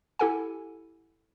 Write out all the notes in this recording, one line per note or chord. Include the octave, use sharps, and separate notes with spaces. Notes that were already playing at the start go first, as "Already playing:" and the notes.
E4 G4 A4 F#5 G#5